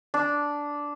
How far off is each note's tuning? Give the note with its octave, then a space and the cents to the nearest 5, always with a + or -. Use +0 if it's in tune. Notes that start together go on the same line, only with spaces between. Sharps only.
D4 -10